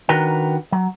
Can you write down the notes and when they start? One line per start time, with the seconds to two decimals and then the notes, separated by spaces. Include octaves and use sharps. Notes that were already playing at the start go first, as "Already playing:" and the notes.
0.09 D#3 D4 F#4 A#4 B4 G5
0.72 F#3